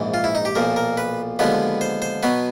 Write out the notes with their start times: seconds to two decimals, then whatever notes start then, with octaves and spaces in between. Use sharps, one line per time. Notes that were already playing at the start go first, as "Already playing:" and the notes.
Already playing: A#1 G#2 E3
0.14 F4
0.24 E4
0.35 D#4
0.45 G4
0.55 B1 A#2 F3 A#4
0.76 A#4
0.97 B4
1.39 D#2 D3 F3 G#3 B3 B4
1.81 C5
2.02 C5
2.23 B2 F#3 B3 B4